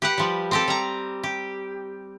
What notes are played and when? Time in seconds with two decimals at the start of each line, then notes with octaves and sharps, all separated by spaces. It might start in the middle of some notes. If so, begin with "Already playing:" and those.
0.02 G4 B4 F#5
0.18 F3 G3
0.51 C4 G4 A4
0.68 G3 A#5
1.23 G4